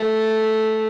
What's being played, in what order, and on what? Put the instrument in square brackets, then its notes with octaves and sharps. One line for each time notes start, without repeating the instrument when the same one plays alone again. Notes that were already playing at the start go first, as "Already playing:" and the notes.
Already playing: [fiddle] A3